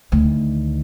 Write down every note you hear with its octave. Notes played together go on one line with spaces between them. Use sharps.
D2 D#3